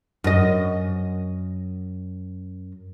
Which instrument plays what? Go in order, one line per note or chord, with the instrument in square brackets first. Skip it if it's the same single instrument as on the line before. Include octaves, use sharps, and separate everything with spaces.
[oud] F#2 D#5